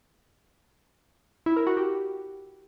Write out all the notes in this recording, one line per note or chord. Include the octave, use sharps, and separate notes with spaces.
E4
A#4
F#4
G4